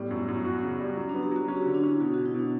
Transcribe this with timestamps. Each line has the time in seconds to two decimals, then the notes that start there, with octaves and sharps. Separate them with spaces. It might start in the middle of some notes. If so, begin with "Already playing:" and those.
Already playing: A2 G3 B3
0.11 F#2
0.28 F#2
0.45 F#4
0.63 C#3
0.80 G3
0.97 F#3 C#4
1.09 B3 D4
1.22 G4
1.31 F#3 F#4
1.48 C#4 F#4
1.57 G4
1.61 D3 F#4
1.74 D4
1.83 C#4 E4
2.00 B2 F#4
2.14 B2 F#4
2.26 E4
2.34 B2 D4